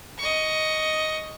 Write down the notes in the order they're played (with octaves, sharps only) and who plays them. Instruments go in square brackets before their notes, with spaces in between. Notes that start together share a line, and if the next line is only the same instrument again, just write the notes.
[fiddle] D#5 C#6